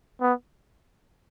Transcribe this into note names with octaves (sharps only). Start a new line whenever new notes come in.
B3